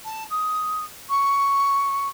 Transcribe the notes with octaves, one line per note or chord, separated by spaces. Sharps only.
A5
D#6
C#6